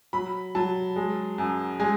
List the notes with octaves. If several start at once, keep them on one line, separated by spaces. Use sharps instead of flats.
F#3 B5
F#3 A5
G#3
F#2
G#3 G#5